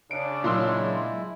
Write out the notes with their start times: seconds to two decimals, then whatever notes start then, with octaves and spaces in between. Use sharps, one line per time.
0.11 C#3 D4 D7
0.44 A#2 F#3 G#3 E4 C6 E6